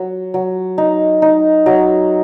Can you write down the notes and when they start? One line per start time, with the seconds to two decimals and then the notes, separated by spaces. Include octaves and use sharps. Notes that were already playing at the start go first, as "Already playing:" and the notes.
Already playing: F#3
0.34 F#3
0.78 D#4
1.22 D#4
1.66 F#3